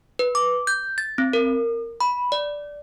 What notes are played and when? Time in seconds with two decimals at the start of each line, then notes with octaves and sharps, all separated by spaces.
0.19 B4
0.35 D6
0.67 G6
0.98 A6
1.18 C4
1.33 A#4
2.01 B5
2.32 D5